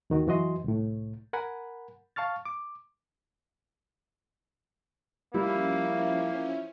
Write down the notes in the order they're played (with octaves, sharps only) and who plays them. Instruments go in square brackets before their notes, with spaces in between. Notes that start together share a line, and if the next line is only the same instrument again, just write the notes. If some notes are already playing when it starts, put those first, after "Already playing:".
[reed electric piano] D#2 D#3 F#4
F#2 E3 F#4 D#5 C6
C2 A2
A#4 F#5 G#5 B5
F5 A5 C#6 F6 A6
D6
[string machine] F3 C#4 [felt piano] G3 [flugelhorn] A#3 [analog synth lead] E4